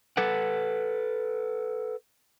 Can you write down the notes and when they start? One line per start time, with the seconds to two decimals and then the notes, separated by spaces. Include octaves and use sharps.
0.17 A4 B4 F#5